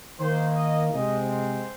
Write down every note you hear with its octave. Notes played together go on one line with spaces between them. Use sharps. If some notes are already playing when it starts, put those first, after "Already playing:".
D#3 A#3 C5
D#5
C3 G#3 C4 D#5
C5